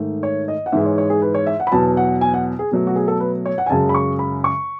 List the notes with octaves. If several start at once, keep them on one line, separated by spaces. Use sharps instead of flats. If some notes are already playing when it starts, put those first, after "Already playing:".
Already playing: G#2 D#3 A3
C#5
D#5
F#5
G#2 E3 G#3 E5
C#5
C#5
G#4
B4
C#5
E5
F#5
B5
E2 B2 F#3 A5
F#5
G#5
F#5
G#4
B2 F#3 A3
F#4
G#4
A4
B4
C#5
F#5
G#5
F#2 C#3 G#3 A5
B5
C#6
B5
C#6